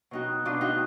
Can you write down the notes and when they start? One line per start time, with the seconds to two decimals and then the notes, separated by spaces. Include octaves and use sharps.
0.11 B2 D#4 F#4
0.45 B2 D4 F4
0.61 D#4 F#4